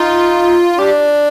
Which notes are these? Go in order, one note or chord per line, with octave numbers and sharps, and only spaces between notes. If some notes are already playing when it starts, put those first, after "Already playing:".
Already playing: D#4 F4
D4 G4